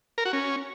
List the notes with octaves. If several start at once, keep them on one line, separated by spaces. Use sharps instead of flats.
A#4
F#4
C#4